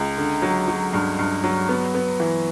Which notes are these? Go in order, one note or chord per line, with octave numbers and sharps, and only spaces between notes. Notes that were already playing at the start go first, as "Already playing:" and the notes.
Already playing: C#2
D3
F#3
F#3
G2
G2
F#3
B3
B3
E3